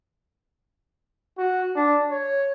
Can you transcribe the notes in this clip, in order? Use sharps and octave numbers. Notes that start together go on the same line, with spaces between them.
F#4
D4
C#5